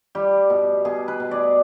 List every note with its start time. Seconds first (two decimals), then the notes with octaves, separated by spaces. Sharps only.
0.15 G3 G4
0.50 B2
0.85 B2 G#4
1.08 B4
1.20 B2
1.31 D5